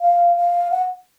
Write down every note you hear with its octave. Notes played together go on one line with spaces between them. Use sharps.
F5
F5
F#5